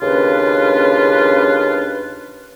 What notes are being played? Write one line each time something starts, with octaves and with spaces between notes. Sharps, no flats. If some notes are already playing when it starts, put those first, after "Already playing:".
D#2 C#3 C#4 D4 F4 B4